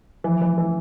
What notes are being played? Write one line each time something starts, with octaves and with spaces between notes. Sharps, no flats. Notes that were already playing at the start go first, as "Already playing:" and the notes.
E3 F3
E3
E3